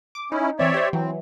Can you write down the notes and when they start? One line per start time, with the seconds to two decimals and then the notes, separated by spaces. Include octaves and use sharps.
0.15 D6
0.32 C#4 D#4 E4
0.59 E3 C4 C#5 D5 E5
0.74 G4 C5
0.93 E3 F#3 C4